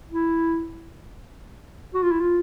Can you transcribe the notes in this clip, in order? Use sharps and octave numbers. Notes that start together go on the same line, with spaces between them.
E4
F#4
F4
E4
F4